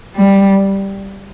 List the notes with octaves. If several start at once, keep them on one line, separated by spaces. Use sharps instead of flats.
G3